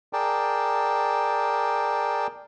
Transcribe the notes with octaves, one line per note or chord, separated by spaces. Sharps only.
G#4 A#4 D5 G5 A5